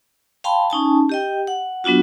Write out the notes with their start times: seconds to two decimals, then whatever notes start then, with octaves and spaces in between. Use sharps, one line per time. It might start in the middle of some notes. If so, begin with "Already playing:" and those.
0.44 F5 G5 A5 B5 C6
0.70 C#4 D#4 G#5 A5
1.09 G4 D#5 G5
1.47 F#5
1.84 F#3 B3 D4 F4 F#4